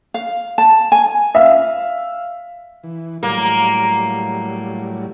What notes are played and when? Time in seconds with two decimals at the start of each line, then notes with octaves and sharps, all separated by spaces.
0.14 F5
0.58 A5
0.92 G#5
1.35 E5 F5
2.84 E3
3.23 A2 F#3 G3 A#3